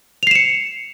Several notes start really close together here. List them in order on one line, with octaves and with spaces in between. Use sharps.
F7 C7 E7 C#7